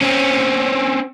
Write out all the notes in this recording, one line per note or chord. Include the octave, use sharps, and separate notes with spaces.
C4 C#4